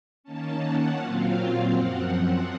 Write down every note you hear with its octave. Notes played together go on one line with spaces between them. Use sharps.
D#3 A#3 C#4 A5
F#5
A#2 F#3 C4 F4 F5
F5
F#2 F3 C4 F#5